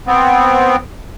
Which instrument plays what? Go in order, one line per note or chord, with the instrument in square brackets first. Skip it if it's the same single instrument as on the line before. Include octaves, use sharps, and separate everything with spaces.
[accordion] B3 C4